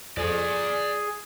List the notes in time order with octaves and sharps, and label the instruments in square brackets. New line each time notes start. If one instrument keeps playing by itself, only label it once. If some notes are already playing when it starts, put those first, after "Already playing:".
[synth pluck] F2 [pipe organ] G#4 [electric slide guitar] D5 G#5